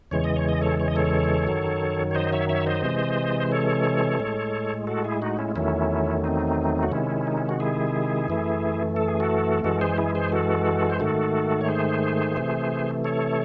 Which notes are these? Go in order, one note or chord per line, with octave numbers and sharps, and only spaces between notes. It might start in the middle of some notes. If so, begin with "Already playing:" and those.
E2 C#3 E3 G#3 C#5
D#5
C#5
D#5
A4 C#5
C#5
D#5
A4 C#5
F#2 D#3 F#3
C#5
C5 D#5
C#5 E5
C#5 E5
C5 D#5
C3 E3 G#3
C5
A4 C#5
A2 G#3
F#4 A4
E4 G#4
D#4 F#4
C#4 E4
E2 D#3 F#3 A3 C#4 E4
C4 D#4
F#4
C3 D#3 G#3 C#4 E4
D#4
E4
F#4
E4 G#4
F#2 E3 A3
A4
G#4
F#4 A4
F#2 E3 G#3 F#4 A4
G#4 C5
E4 G#4
G#4 C5
F#4 A4
C5
G#2 D#3 A3 F#4 A4
C#5
G#4 C5
C3 E3 A3
A4 C#5